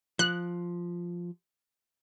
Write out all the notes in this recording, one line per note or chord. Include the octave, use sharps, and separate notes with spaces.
F3 F#6